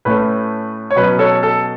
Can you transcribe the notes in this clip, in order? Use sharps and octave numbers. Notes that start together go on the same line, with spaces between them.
A2 A3 C#4 B4
C#5
B2 F#3 C#4 B4
A4 C#5
A4